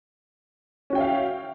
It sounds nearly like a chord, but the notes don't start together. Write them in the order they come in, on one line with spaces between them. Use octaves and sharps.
C#4 F#4 G5 E5 F5